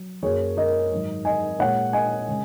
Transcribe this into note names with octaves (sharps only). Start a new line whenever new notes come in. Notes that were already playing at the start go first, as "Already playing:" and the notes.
Already playing: F#3
F#2 F#3 A#3 G#4 C#5
A#4 D#5
G#2 D#3 F#3
D#5 G#5
A#2 G#3 C#5 F#5
D#5 G#5
C#3 G#3